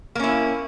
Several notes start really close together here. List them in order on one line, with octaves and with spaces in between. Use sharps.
A#3 C#4 E4